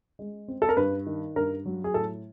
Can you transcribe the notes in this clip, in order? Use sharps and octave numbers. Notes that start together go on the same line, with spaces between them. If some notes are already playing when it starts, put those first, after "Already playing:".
G#3
C4
A4
A#4
G2 B4
D#3
G2 A#4
F#3
G#4
A2 A4